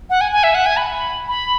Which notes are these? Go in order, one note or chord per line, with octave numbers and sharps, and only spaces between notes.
F#5
G#5
G#5
E5
F#5
G#5
B5
B5